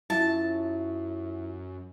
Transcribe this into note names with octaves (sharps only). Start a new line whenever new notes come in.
F#2 E4 F4 E5 A5